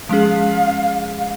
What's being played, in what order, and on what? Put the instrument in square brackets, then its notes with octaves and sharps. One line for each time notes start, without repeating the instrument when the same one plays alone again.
[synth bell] F3 G#3 C#4 G#4 [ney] F5
[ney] F5